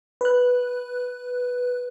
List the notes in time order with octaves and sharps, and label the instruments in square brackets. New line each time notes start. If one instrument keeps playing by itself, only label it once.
[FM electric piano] B4 F#6